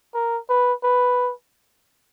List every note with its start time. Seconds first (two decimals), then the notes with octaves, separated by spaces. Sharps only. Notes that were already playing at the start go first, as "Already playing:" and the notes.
0.14 A#4
0.49 B4
0.83 B4